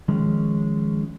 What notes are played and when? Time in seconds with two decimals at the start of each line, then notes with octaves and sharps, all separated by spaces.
0.08 D#3 F3 G#3 C#4